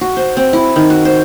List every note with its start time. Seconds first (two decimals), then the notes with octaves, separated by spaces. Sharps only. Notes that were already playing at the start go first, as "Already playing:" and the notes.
0.01 F#4
0.17 C5
0.37 C4
0.53 E4
0.76 D#3
0.90 F#4
1.05 C5